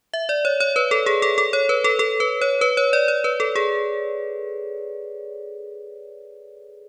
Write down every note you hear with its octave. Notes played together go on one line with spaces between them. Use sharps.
E5
D5
C#5
C#5
B4
A4
G#4
A4
A4
C#5
B4
A4
A4
B4
C#5
B4
C#5
D5
C#5
B4
A4
G#4